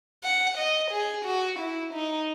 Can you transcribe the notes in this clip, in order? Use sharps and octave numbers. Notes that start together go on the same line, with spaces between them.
F#5
D#5
G#4
F#4
E4
D#4